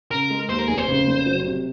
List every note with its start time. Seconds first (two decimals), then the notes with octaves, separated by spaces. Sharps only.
0.11 C#3 A#4
0.30 G#3
0.49 D#2 C5
0.59 A#4
0.68 F1 G#4
0.78 C5
0.88 C#3
1.07 F1
1.26 F#3
1.45 C3